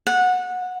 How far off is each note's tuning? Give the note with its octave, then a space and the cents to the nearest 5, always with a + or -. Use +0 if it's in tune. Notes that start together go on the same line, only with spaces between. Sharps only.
F#5 -20